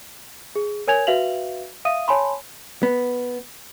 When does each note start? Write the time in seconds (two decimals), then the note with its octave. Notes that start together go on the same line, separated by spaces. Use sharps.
0.56 G#4
0.87 A#4 C#5 G#5 G#6 F7
1.07 F#4 B4 E5 F5 F7 F#7
1.85 E5 F5 D#6 D#7
2.08 C#5 G#5 A5 B5 C6
2.83 B3